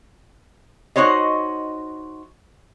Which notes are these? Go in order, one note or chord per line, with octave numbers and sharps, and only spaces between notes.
D#4 F#4 C5 C#5 D#5